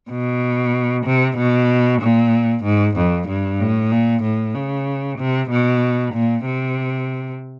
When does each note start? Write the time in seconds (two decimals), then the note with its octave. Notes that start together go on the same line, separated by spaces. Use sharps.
0.11 B2
1.06 C3
1.37 B2
2.01 A#2
2.64 G#2
2.97 F2
3.28 G2
3.60 A2
3.92 A#2
4.23 A2
4.55 C#3
5.18 C3
5.50 B2
6.13 A#2
6.46 C3